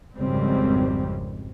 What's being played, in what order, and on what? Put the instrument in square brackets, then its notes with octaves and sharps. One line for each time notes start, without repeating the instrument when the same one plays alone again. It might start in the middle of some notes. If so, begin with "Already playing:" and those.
[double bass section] G#1 F2 C#3 G3 G#3 C4